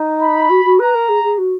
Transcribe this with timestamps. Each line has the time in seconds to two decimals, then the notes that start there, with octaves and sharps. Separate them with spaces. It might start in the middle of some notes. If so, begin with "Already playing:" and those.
Already playing: D#4
0.20 B5
0.49 F#4
0.64 F#4
0.79 B4 A#5
0.94 A#4
1.08 G#4
1.23 G#4
1.38 F#4